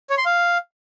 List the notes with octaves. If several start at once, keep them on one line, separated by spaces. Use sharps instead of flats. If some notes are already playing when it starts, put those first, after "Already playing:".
C#5
C6
F5